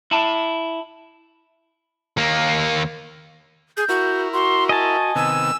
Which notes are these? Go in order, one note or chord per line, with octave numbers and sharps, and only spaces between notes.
E4 A5
D#2 A#3
G#4 G6
E4 F#4 A#4
F#4 C6
D#5 G#5 A5
C3 D#3 B3 E6